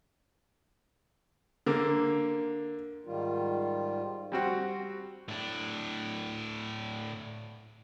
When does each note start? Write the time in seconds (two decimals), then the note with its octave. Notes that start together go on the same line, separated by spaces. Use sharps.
1.66 D3 A#3
3.04 G#2 D#3 G3 F4
4.32 G3 C4 F#4
5.28 A2 D4